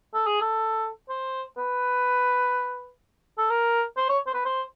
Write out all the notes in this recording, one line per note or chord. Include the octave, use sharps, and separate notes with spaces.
A4
G#4
A4
C5
B4
A4
A#4
C5
C#5
C5
B4
C5